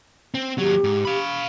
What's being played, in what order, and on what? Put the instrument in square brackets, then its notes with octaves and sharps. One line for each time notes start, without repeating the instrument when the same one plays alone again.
[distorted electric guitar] C4
[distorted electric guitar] D#2 F#3 [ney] G4
[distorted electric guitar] G#2
F5 B5